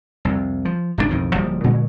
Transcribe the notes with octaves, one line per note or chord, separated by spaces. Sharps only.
C2 F2
F3
G#1 C#2 B2 D4
B1 F2 A2 D#3
D1 F3 G3 A#3
A#2 D3 F#3 G#3